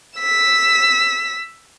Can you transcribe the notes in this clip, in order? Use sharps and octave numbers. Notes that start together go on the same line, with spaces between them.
E6 B6